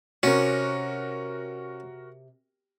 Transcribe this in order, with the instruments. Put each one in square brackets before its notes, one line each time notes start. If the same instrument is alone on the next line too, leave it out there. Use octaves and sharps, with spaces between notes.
[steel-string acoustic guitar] C3 [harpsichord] C#4 [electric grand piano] F#4 A#4